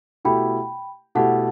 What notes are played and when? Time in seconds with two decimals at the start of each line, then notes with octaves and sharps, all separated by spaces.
0.25 B2 A3 E4 G4 G5 B5
1.15 B2 A3 E4 G4 F#5 A5